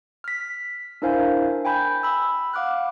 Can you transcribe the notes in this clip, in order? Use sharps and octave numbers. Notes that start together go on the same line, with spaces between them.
F6 B6
D4 E4 A#4 C5 F5 G#5
G5 G#5 B5 G6
B5 E6
F5 F#5 D6 F6 F#6